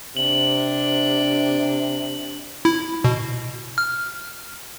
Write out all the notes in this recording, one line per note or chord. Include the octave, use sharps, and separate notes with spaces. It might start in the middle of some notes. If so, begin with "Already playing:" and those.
C3 D4 F#7
E4
B2
F6